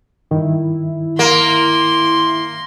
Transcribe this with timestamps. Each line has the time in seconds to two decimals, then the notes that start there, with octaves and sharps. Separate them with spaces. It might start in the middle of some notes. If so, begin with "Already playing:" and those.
0.31 G2 D#3 E4
1.19 A#3 C6